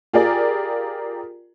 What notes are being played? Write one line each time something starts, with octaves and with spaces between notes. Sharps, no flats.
F4 G4 G#4 A#4 D5